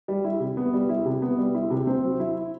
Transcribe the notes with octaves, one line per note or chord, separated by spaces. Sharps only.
G3
E4
C3
B3
G3
E4
C3
B3
G3
E4
C3
C4
F#3
E4